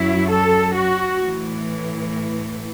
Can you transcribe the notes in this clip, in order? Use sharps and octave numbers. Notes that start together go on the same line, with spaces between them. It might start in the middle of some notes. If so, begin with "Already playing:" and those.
Already playing: F#2 F#3 E4
A4
F#4
A2 E3